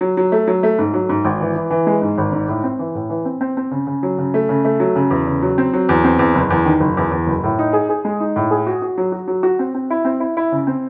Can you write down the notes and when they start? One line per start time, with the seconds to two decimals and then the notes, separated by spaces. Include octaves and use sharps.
0.01 F#3
0.17 F#3
0.32 A3
0.47 F#3
0.63 A3
0.79 G#2
0.94 F#3
1.09 G#2
1.25 G#1
1.41 E3
1.56 E3
1.71 E3
1.87 G#3
2.02 G#2
2.18 G#1
2.32 G#2
2.48 A2
2.64 C4
2.79 E3
2.95 A2
3.10 E3
3.25 C4
3.41 C4
3.57 C4
3.71 C#3
3.87 C#3
4.03 F#3
4.18 C#3
4.34 A3
4.49 C#3
4.65 A3
4.80 F#3
4.96 C#3
5.10 E2
5.27 C#3
5.42 F#3
5.58 C4
5.73 F#3
5.89 E2
6.04 C4
6.19 E2
6.35 F#1
6.50 E2
6.66 D#3
6.80 F#1
6.97 E2
7.11 E2
7.27 F#1
7.43 A2
7.59 D#4
7.73 G#4
7.89 G#4
8.05 G#3
8.20 D#4
8.36 A2
8.51 G#4
8.67 F#4
8.82 F#4
8.98 F#3
9.12 F#4
9.28 F#3
9.43 F#4
9.59 C4
9.75 C4
9.90 E4
10.05 C4
10.20 E4
10.37 E4
10.52 C#3
10.67 C4